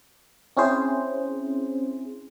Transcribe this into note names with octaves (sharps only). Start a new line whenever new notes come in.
C4 C#4 E4 G#4 C5